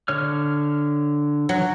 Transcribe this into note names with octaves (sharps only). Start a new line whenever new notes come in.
D3 C#5 F6
F#3